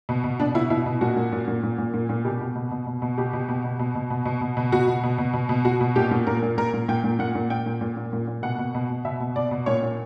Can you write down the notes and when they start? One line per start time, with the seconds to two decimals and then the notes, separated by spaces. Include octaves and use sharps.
0.09 B2
0.24 B2
0.40 B2 D4
0.55 B2 E4
0.70 B2 E4
0.86 B2
1.01 A#2 F#4
1.16 A#2
1.32 A#2
1.48 A#2
1.63 A#2
1.78 A#2
1.94 A#2
2.09 A#2
2.25 B2 G4
2.41 B2
2.56 B2
2.71 B2
2.87 B2
3.02 B2
3.18 B2 G4
3.33 B2
3.49 B2
3.64 B2
3.79 B2
3.95 B2
4.10 B2
4.26 B2
4.41 B2
4.57 B2
4.72 B2 F#4
4.87 B2
5.04 B2
5.18 B2
5.34 B2
5.49 B2
5.65 B2 F#4
5.81 B2
5.96 A#2 G4
6.11 A#2
6.27 A#2 A#4
6.42 A#2
6.57 A#2 A#4
6.73 A#2
6.88 A#2 G5
7.04 A#2
7.19 A#2 F#5
7.35 A#2
7.50 A#2 G5
7.66 A#2
7.81 A#2
7.97 A#2
8.13 A#2
8.27 A#2
8.43 B2 F#5
8.58 B2
8.75 B2
8.90 B2
9.05 B2 E5
9.20 B2
9.36 B2 D5
9.51 B2
9.66 A#2 C#5
9.83 A#2